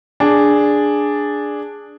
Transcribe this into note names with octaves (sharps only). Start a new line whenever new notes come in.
D4 G#4